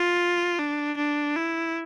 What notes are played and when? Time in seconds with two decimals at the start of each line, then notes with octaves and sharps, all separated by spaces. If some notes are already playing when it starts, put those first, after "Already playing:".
Already playing: F4
0.59 D4
0.97 D4
1.36 E4